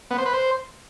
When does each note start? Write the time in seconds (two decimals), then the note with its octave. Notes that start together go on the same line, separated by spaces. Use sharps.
0.11 B3
0.18 C5
0.26 B4
0.33 C5